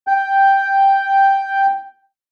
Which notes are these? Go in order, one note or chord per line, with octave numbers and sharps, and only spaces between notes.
G5 G6